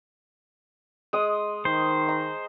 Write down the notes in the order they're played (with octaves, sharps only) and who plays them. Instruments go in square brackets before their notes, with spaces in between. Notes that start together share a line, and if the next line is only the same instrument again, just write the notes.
[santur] G#3 C6 D#6
[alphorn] D#3 [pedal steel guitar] C5
[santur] A#5